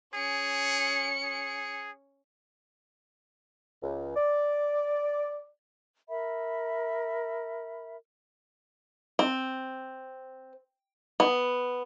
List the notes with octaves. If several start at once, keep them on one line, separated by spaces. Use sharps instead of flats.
C#4 G#4 C#7
G#4
C#2
D5
A#4 E5 B5
C4
B3